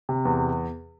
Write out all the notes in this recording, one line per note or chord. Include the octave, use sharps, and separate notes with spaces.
C3
E2